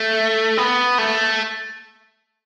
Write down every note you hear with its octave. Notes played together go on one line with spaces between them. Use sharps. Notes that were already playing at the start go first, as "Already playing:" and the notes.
Already playing: A3
B3
A3